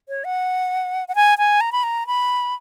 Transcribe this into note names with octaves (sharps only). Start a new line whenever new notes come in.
C#5
F#5
F#5
G#5
G#5
A#5
B5
A#5
B5